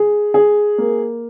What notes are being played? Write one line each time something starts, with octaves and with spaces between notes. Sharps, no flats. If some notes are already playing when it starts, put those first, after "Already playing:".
Already playing: G#4
G#4
A#3